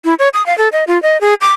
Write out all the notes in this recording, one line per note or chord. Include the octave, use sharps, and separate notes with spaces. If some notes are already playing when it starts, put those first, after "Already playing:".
E4
C#5
D#6
F5
A4
D#5
F4
D#5
G#4
D6